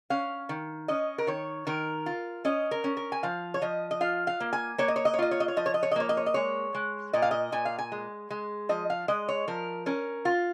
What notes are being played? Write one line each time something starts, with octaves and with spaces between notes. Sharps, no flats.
C#4 F5
D#3
C#4 D#5
A#4
D#3 C#5
D#3 A#4
F4
C#4 D#5
A#4
C#4
A#4
G#5
F3 F5
C#5
F3 D#5
D#5
F4 F5
F5
A#3
G#5
A#3 C#5
D#5
C#5
D#5
C#5
F4 D#5
C#5
D#5
C#5
F3 D#5
C#5
D#5
C#5
D#5
A#3 C#5
D#5
C#5
D#5
G#3 C#5
G#3
A#2 D#5
F5
D#5
A#2 G#5
F5
G#5
G#3
G#3
F3 D#5
F5
G#3 D#5
C#5
F3 A#4
C#4 A#4
F4